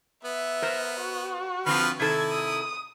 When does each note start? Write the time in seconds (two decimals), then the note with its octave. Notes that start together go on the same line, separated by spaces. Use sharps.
0.25 B3 E5
0.62 A#4 C5
1.00 F#4
1.66 D3 F3 C4 F4 B4 F6
2.00 C3 D#3 E4 A4 G#6
2.30 D#6